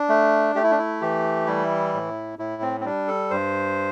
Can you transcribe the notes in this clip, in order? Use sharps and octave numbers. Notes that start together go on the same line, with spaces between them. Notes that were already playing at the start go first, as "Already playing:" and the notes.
Already playing: D4
A3
A3 G4
E4
D4
E4
E3 G4
G3 E4
A2
A2 E4
C4
C4
G3 D4
A4
G2 C5